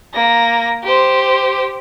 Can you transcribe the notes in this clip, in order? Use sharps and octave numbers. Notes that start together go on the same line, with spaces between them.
A#3 A#6
G4 C5